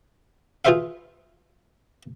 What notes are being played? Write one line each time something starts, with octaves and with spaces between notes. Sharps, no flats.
F4 G#4 B4 C5 E5 F5